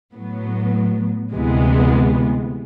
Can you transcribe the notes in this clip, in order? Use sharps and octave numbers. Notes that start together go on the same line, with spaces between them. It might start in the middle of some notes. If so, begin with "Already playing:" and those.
A2 F#3 B3
D2 C3 E3 G#3 B3